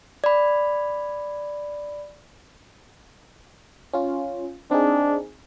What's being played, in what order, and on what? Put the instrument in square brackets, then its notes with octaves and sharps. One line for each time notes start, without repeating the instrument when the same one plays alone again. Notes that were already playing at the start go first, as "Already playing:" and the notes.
[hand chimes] D5 B5
[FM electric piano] C#4 F4
[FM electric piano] C4 D#4 G#4 [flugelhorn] D4